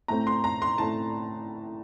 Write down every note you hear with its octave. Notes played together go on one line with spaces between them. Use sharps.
A2 A3 C4 A#5
C6
A#5
C6
A2 A3 C4 A5